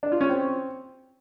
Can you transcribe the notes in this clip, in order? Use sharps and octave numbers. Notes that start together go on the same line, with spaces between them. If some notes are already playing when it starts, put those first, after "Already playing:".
D4
F4
C#4
C4